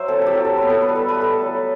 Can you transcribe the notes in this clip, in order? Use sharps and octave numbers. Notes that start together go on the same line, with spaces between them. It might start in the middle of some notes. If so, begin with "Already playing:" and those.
Already playing: F#3 C5 E5
C4 A4
G4 A4
F#3
A4
B3 B4
A4
B4
G3
A4
B4
A3
A4
F#3